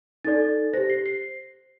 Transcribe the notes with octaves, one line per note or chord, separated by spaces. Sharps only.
D#4 A4 D5 A6
G4 C5 A#6
C7
C7